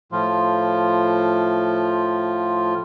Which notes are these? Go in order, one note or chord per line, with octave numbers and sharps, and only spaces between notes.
A2 F3 F4